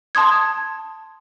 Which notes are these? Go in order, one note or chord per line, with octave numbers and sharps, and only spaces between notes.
A5 C6 D#6 G#6